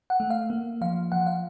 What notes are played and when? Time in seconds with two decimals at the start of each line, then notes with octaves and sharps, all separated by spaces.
0.10 F#5
0.20 A3
0.30 F5
0.50 A#3
0.81 F3 F5
1.12 F3 F#5
1.27 F5